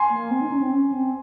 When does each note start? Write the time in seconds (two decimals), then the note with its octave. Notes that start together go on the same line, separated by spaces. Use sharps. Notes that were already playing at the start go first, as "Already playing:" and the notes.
Already playing: G#5 C6
0.11 A#3
0.31 C4
0.41 D#4
0.52 C#4
0.61 C4
0.72 C#4
0.92 C4